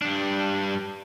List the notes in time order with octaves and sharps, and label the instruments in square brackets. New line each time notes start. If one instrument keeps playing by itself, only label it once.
[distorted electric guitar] G2 D4